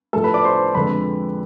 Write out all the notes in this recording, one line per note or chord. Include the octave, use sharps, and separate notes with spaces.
A2 F3 A3 A4 A5
B4 B5
D5 D6
C5 C6
F2 D3 G#3 B4 B5